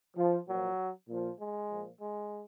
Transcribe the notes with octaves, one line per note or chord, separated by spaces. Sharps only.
F3
A#2 F3 F#3
A#2 F3
G#3
A#2 F3
G#3